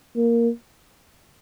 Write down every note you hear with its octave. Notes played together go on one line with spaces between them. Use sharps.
A#3